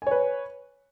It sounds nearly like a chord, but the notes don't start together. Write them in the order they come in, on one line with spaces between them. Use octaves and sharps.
G#5 C#5 B4